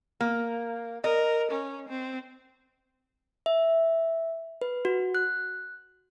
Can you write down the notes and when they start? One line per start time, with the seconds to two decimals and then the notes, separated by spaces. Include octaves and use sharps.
0.21 A#3
1.04 A#4 D#5
1.51 C#4
1.89 C4
3.46 E5
4.61 B4
4.85 F#4
5.15 F#6